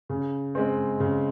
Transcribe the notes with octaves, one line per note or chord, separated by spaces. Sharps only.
C#3
G#3 C4
C#3